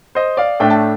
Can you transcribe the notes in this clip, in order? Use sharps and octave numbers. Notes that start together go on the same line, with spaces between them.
C5 D#5
D5 F5
A2 A3 D4 G5
A5